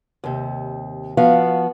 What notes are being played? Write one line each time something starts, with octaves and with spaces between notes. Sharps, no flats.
D#2 C3
F3 B3 F#4 F5